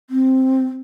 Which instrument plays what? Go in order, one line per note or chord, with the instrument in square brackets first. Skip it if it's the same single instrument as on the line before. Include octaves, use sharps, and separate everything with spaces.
[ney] C4